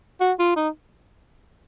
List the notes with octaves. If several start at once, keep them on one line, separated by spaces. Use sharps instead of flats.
F#4
F4
D#4